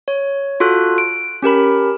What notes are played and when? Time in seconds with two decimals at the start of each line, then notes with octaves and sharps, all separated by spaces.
0.08 C#5
0.60 F4 F#4 A4 F#6
0.98 D7
1.42 C#4 G4 A#4 B5